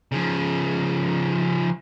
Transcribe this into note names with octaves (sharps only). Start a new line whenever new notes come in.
C#3 F3